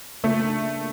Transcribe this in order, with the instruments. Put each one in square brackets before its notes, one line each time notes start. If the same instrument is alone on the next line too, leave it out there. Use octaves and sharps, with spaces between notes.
[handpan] C#3 [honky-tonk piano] A3
[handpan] D4
A#3